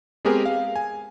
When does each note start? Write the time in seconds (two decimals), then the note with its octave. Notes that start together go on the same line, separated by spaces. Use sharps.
0.25 G#3 B3 C4 G4 G#4 A#4
0.46 F5
0.76 G#5